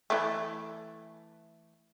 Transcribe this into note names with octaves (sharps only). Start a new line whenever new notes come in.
E3 A3